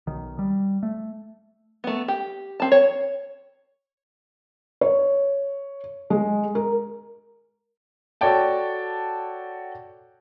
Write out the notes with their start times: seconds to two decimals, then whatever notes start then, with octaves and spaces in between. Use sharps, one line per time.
0.07 B1 D#3
0.39 G3
0.83 A3
1.84 A3 B3
2.08 G4
2.60 C4 A5
2.72 C#5
4.81 C#5
6.10 G#3
6.55 A#4
8.21 F#4 A4 C#5 D5 G5 A5